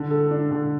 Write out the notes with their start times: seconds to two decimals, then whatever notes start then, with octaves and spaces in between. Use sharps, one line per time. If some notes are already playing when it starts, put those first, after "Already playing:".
Already playing: D3
0.11 A4
0.31 D4
0.51 D3